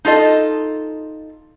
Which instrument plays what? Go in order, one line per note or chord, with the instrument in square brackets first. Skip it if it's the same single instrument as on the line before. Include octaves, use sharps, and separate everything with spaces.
[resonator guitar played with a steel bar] D#4 F4 A4 D#5